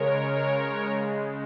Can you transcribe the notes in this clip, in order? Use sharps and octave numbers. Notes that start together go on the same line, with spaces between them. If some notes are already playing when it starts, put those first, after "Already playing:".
Already playing: C#3 G#3 A#4 C#5
A#4 C#5